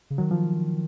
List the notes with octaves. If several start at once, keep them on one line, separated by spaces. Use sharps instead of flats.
C#3
D#3 F#3
F3